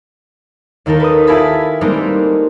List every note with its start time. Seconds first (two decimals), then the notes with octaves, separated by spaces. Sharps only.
0.86 D#2 D#3 D#4 A4 A#4
1.00 B4 D#6
1.27 E4 F4 G4 G#5 A5 B5
1.81 G3 G#3 A#3 C4 D#4